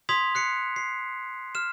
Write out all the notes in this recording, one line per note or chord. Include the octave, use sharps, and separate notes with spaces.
C6 D#6 G#6 B6 F7
F#6 C7 C#7
C7
F6 E7